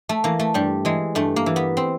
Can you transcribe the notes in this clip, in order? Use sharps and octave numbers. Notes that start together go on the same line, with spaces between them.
A3
E3 A#3
A3
G2 G3
E3 G#3
G2 A3
A#3
E3
B3
C4